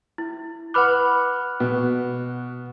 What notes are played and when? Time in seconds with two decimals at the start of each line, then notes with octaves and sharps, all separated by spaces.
0.18 E4
0.74 B4 F#5 B5 D6 F6 F#6
1.60 B2